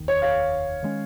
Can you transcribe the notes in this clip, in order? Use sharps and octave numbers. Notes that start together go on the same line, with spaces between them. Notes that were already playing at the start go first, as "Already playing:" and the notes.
Already playing: F1 D#2 D#3
C#5
C#5 F5
D#3 G#3 C#4